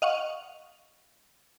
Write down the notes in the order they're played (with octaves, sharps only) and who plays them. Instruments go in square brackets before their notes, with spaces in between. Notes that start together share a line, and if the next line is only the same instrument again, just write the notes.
[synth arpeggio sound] D#5 F5 F#5 C#6